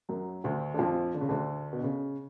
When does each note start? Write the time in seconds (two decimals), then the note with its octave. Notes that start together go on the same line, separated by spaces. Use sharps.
0.09 F#2 F#3
0.44 D2 D3
0.74 D3
0.79 F2 F3
1.14 D3
1.21 C#3
1.29 D2 D3
1.73 B2
1.83 C#3